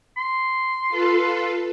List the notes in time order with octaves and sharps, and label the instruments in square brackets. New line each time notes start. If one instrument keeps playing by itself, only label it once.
[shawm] C6
[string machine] F4 A4 B4